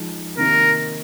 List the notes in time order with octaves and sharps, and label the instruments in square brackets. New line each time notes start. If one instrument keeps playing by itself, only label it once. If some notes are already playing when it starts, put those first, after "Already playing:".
Already playing: [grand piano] F3 G#3 D#4
[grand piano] C3 D#3 A#3 [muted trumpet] A#4